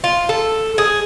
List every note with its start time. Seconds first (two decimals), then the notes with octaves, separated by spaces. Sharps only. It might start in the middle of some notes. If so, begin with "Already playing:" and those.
0.04 F4
0.29 A4
0.78 G#4